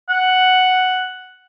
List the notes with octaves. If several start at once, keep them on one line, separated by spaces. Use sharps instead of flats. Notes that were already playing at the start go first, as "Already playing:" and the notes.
F#5